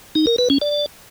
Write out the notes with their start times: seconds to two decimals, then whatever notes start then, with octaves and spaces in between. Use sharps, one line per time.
0.15 D#4
0.27 A#4
0.38 B4
0.50 C#4
0.61 D5